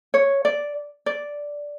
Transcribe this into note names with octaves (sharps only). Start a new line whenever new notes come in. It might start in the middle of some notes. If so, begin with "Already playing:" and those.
C#5
D5
D5